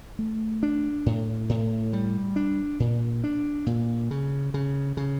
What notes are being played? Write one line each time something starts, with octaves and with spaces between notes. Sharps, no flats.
A3
D4
A2
A2
G3
D4
A#2
D4
A#2
C#3
C#3
C#3